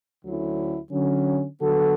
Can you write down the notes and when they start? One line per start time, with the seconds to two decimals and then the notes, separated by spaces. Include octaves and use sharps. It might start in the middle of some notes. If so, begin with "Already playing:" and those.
0.24 D2 D3 F#3 C#4 E4
0.91 D3 F#3 C#4
1.59 D3 F#3 B3 F#4 A4